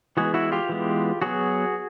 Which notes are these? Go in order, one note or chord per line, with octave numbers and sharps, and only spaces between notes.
E3 G#3 B3 F#4 G#4
E4 F#4
F4 G4
E3 G#3 B3
F#3 B3 F#4 G#4